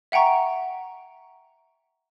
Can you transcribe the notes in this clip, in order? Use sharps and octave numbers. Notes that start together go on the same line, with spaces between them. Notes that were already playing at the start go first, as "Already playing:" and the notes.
E5 F#5 G5 A#5 C#6